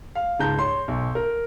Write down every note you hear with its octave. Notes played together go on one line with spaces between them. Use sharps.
F5
C#2 G#2 A5 A#5 G6
C#5 C6
B1
A#4